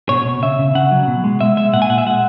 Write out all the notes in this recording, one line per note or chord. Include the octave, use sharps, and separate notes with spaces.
B2 C#5
B2
C#3 E5
C#3
C#3 F#5
F#3
B2
G#3
B2 E5
G#3 E5
A#2 F#5
G#5
A#2 F#5
E5
G#3 F#5